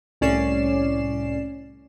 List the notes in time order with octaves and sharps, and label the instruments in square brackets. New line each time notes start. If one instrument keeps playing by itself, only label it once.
[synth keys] C2 A2 C#4 D5 C7 E7